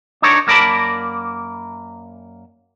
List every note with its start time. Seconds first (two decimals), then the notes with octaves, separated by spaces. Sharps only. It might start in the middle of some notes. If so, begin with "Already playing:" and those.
0.22 D4 D#4 A#4 C#5
0.47 F#2 A#3 A#4 D5 A5 B5